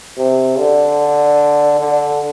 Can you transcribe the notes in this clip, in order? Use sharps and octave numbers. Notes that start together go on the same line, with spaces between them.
C3
D3
D3